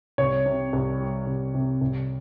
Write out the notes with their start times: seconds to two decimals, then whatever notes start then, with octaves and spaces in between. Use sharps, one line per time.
0.18 C2 C#5
0.46 C3
0.73 C2
1.00 G3
1.27 C2
1.54 C3
1.81 C2